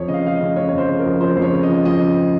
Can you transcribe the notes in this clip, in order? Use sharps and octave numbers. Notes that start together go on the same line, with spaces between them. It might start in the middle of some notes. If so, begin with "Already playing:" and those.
Already playing: F2 C#5
C#3 D#5
F5
F3 F5
D#5
C#3
C#3 C#5
C#5
F2
C5
C#3
A#4
F2
F3 C5
F2 C5
C#5
C#3
D#5
F3
F2 D#5
C#3